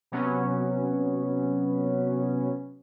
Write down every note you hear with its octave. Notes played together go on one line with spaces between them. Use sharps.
C3 F#3 B3 C#4